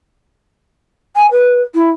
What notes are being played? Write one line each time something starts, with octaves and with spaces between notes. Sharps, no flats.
G#5
B4
E4